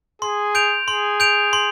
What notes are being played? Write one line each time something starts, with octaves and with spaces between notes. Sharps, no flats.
G#4 C6
G6 D7 F7
G#4 C6
G6 D7 F7
C6